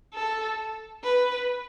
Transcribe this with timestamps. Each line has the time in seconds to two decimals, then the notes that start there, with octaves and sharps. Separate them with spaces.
0.14 A4
1.03 B4